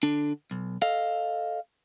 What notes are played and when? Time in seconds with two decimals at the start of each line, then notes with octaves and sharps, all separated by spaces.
0.03 D3 D4
0.51 B1
0.82 A4 D#5 F5